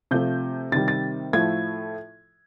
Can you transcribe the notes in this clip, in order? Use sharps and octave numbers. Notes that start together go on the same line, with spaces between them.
C3 F3 A3 G6
C3 D#3 G3 A6
A6
A2 F3 A3 G#6